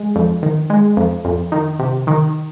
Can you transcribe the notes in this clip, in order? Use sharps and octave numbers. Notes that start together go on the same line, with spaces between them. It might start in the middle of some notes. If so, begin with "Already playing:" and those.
Already playing: G#3
F2
D#3
G#3
F2
F2
D#3
C3
D#3